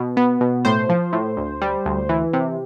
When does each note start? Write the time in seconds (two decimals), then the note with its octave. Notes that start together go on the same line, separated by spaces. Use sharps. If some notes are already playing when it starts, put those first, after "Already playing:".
Already playing: B2
0.17 B3
0.41 B2
0.65 A2 C5
0.89 F3
1.13 A2
1.37 D2
1.62 G3
1.85 D2
2.09 E3
2.33 C3